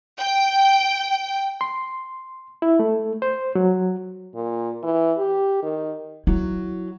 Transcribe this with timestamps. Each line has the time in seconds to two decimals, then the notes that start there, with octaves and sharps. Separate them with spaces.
0.19 G5
1.61 C6
2.62 E4
2.80 A3
3.22 C5
3.55 F#3
4.35 A#2
4.83 E3
5.18 G4
5.63 D#3
6.27 F#3 E4